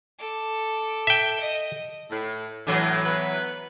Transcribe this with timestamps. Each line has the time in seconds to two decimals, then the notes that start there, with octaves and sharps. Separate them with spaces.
0.19 A4 D6
1.07 E5 G5
1.40 D#5
2.10 A2
2.67 A2 E3 F#3
3.05 B3 B4